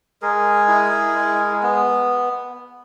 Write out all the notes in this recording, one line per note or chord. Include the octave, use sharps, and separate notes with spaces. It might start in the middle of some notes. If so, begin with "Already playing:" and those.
G#3 G#4 A#4
E4
G#3
B3